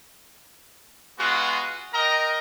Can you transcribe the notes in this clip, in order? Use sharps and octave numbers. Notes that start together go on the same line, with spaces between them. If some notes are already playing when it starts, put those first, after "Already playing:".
G#3 B3 F4 F#4
A#4 D#5 G5 A#5